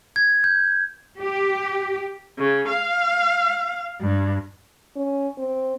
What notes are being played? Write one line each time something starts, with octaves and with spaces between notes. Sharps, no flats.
G#6
G6
G4
C#3
F5
G2
C#4
C4